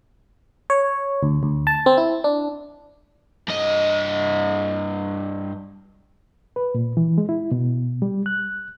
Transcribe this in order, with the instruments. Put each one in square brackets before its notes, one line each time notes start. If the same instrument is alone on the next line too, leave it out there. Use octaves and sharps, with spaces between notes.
[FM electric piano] C#5
D2
D2
A5
C4
E4
D4
[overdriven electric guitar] G2 D#5
[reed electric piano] B4
A#2
E3
G#3
E4
B2
G3
F#6